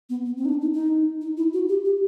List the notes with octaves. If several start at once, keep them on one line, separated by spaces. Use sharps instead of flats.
B3
B3
C4
D#4
D4
D#4
D#4
D#4
E4
F#4
G4
G4